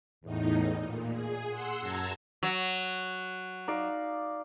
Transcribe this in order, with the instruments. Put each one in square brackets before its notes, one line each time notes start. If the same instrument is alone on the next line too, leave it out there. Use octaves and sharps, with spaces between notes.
[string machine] E2 A2 D#4
A#2
G#4
F#5 C6 E6
F#2 A5 A#5 E6 G#6
[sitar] F#3
[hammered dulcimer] D#4 D5 F5